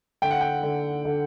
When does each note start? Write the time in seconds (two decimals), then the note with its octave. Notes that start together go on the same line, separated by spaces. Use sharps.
0.22 D3 G5
0.31 F#5
0.41 G5
0.63 D3
1.05 D3